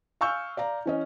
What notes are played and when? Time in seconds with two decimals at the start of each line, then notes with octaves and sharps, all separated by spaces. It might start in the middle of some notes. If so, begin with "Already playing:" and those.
0.21 F5 G#5 C#6 E6 F6 G6
0.57 D5 F5 A#5
0.86 E3 C#4 D#5